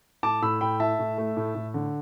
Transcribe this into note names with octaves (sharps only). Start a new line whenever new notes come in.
A2 A5 D6
A2 B5 E6
A2 G5 B5
E4 E5 A5
A2
A3
A2
A2
D3